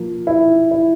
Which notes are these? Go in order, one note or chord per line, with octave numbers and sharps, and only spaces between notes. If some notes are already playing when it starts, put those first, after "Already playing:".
Already playing: F3 A#3
E4
E4